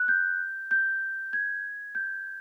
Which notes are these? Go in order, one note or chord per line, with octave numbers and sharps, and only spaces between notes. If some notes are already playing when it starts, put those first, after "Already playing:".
Already playing: F#6
G6
G6
G#6
G6